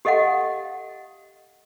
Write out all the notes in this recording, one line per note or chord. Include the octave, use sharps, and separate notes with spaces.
G4 A4 D#5 F5 F#5